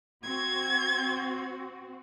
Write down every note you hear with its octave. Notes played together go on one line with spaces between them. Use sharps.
C4 F#4 G#6